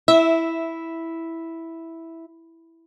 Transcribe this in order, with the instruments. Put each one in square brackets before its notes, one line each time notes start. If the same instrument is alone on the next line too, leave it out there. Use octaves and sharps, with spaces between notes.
[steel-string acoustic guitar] E4 [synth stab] E5